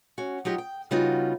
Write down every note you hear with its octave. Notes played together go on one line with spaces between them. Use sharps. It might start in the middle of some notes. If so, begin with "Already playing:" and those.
C#4 F#4
F#3 D#4 F4 G4
G5
C#3 G3 B3 D#4 F4 F#4